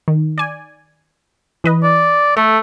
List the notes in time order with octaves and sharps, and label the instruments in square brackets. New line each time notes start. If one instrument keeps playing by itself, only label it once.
[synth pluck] D#3
D5 G#5
E3 B4 D#5
[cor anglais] D5
[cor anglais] A3 [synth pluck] A4